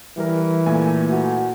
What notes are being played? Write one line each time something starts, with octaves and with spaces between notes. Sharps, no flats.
E3 G3 A#4
A#2 A3 G#5
F#4